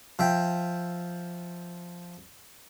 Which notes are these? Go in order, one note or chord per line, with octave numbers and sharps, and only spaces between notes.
F3 E5 G5